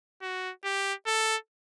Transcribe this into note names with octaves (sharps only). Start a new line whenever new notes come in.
F#4
G4
A4